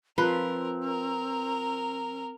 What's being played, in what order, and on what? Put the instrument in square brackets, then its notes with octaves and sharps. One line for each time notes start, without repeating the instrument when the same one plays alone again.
[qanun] F3 C6 [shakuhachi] C4 [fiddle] A#4 [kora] B4
[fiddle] A#4 A#5